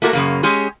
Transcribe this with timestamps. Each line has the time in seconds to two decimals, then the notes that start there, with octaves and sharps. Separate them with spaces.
0.02 A3 A#3 F#4 A4 A#4
0.13 F#2 C#3 A#3
0.43 G#3 C#4 G4 G#4